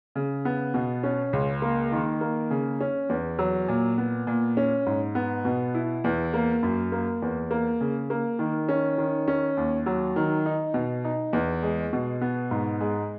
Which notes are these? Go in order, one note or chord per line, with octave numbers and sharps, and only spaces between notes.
C#3
B3
B2
C#4
C#2
A#3
D#3
A#3
C#3
C#4
E2
F#3
A#2
B3
A#2
C#4
G#2
B3
B2
E4
E2
A#3
F#2
A#3
E2
A#3
C#3
A#3
D#3
C#4
D#3
C#4
D#2
F#3
D#3
D#4
B2
D#4
E2
G#3
B2
B3
G#2
G#3